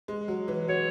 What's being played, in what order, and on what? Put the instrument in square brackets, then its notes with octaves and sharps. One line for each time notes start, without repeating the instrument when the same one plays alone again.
[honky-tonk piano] G#3
F#3
E3
[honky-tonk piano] F#3 [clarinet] C#5